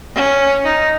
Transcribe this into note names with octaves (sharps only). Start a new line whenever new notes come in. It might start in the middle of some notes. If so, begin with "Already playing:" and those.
C#4
D#4